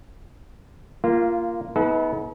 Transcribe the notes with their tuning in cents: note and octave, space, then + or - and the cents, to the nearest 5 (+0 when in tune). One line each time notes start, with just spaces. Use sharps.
A#3 +0 F4 -20
B3 +0 D#4 +45 A4 -45